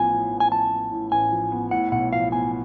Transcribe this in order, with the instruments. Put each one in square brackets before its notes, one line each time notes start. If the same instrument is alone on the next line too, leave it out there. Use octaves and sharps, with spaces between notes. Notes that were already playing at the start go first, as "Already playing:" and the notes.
Already playing: [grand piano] A1 A2 F3 B3 [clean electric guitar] G#5
[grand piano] A2
A1
[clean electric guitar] G#5
[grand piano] F3 [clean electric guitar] A5
[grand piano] B3
A2
[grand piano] A1 [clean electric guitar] G#5
[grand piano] F3
B3
[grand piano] A2 [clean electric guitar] F#5
[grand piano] B1 [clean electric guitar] F#5
[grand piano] F3 [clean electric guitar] F5
[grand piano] B3 [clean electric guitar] G#5